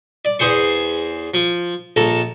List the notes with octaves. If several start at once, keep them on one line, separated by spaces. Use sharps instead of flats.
D5
E2 G#4 C5 C#6
F3
A#1 A4 A5 A#5